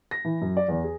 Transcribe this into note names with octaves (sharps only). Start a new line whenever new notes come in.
A#6
E3
F#2
D5
E2
G#4